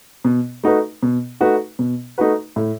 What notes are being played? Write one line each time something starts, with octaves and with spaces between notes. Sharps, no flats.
B2
A3 D#4 F#4 B4
B2
A3 D#4 F#4 B4
B2
A3 D#4 F#4 B4
A2